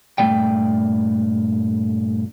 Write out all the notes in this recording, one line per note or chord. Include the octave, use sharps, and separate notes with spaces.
G2 A#2 A3 D5 G5